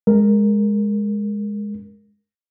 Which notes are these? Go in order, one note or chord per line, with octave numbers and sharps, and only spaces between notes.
G#3 A#4